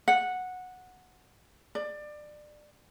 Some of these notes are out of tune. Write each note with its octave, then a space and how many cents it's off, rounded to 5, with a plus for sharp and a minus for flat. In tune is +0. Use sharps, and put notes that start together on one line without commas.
F#5 -10
D5 +25